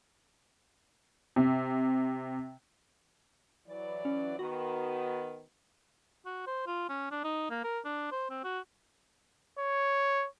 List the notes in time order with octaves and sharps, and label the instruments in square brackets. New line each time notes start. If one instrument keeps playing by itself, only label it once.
[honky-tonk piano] C3
[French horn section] E3 F#3 D5
[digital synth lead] C#4
[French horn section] D#3 B3 [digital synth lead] F#4
[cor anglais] F#4
C5
F4
C#4
D4
D#4
A#3
A#4
D4
C5
C4
F#4
[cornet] C#5